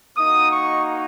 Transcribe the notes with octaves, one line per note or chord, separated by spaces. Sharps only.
A#3 D#4 F#4 D#6
C#6